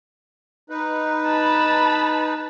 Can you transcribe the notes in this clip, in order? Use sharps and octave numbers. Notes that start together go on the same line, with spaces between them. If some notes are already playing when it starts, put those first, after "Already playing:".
D#4 B4
A5 B5